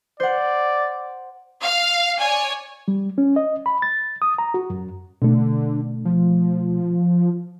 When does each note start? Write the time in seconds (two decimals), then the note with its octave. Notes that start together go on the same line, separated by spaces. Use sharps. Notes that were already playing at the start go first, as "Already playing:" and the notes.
0.20 C5 D5 F#5
1.64 F5
2.20 C#5 D5 G#5
2.88 G3
3.18 C#4
3.36 D#5
3.66 B5
3.82 A6
4.22 D#6
4.38 A#5
4.54 F#4
4.70 F#2
5.22 B2 D3 A3
6.05 F3